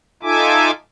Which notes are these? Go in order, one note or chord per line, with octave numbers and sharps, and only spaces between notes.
D#4 F4 A4 E5 G#5 D6